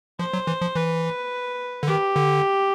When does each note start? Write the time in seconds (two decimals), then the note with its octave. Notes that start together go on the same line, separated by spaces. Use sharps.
0.19 F3 C5
0.33 F#3
0.47 E3
0.61 F3
0.75 E3 B4
1.83 D3
1.87 D#3 G4
2.16 D3